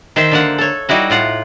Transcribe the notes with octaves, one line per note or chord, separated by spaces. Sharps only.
D#3 C5 E5
D3 A#3 F#5
A4 C#5
G3 D#4 E4 F#4
A2 F4 F#5